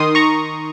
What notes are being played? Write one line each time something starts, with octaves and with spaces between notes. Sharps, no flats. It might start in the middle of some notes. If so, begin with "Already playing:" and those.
Already playing: D#3 C6 D#6
A#5 C#6